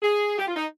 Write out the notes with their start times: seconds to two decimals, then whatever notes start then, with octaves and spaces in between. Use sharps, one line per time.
0.02 G#4
0.38 G4
0.47 F4
0.56 D#4